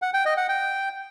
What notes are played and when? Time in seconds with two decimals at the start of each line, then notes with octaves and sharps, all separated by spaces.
0.02 F#5
0.14 G5
0.25 D#5
0.37 F#5
0.49 G5